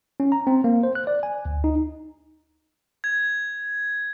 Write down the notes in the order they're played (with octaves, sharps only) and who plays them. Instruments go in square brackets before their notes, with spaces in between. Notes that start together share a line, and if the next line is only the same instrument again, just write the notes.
[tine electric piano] C#4
A#5
C4
A#3
C5
F#6
D5
G#5
D2
D#4
[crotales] G#6